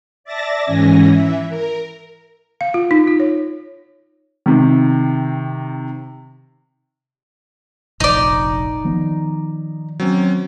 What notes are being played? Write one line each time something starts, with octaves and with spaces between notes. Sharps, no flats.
D5 E5 A5 A6 A#6
G#2 E3 C#4 G#5 A#6
E3 E5
A#4
F5
F4
D#4
F4
C#5
C3 D#3
F1 A#1 D#4 D5
D#3 F3 B3
F#3 C4 C#4